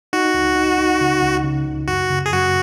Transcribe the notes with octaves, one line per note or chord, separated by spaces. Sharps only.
D#4 F#4
C#2
D#4
D#4
C#3
C#2
C#3
C#2
F#2 F#4
C#3
G#4
F#2 F#4